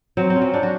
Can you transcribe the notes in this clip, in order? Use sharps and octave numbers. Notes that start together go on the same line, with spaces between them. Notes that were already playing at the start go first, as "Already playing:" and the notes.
F#3 C4
C4
C#4
F#3
D4
F#4